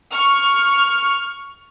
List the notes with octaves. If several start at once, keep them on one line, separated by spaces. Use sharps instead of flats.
C#6 F6